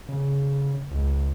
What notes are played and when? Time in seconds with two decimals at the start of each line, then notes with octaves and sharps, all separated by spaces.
0.09 C#3
0.91 C#2